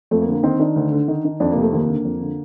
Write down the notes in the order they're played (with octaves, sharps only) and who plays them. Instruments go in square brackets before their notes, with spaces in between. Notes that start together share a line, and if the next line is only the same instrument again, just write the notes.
[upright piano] F2 A3
A#3
D3
A#3
D#3 C4
D#3 D4
D2
D3
D#3
D#3
F2 D4
C3 A#3
A3
D#2 A#3
D3
F2
D3